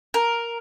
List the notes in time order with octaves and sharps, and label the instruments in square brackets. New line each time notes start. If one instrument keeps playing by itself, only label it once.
[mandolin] A#4